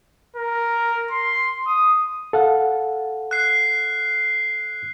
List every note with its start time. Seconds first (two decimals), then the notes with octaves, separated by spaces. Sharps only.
0.36 A#4
1.11 C6
1.67 D#6
2.33 A4 F5 F#5
3.31 F#6 C7